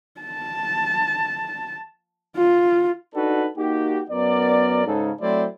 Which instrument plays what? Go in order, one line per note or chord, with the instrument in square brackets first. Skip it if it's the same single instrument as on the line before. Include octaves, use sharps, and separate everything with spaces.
[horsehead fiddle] A5
F4
[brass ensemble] D4 D#4 F#4 A4 B4 D5
A#3 D#4 F#4 G4
F#2 B3 A#4 D5
G#2 C#3 A4
F#3 A3 C4 E4 C5 D5